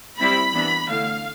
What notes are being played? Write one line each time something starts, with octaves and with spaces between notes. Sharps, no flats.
G3 C4 E4 B5
E3 B3 D4
D3 A3 E4 F5